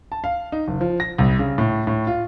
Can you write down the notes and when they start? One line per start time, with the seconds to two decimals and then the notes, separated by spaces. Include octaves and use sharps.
0.12 A5
0.24 F5
0.52 D#4
0.68 F#1
0.81 F3
1.00 A#6
1.18 C2
1.39 C#3
1.58 A2
1.87 A2
2.07 F4